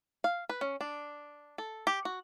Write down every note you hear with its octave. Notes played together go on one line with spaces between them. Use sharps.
F5
B4
C#4
D4
A4
G4
F#4